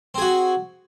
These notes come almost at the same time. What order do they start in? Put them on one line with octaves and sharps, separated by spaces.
C4 G#4 F#4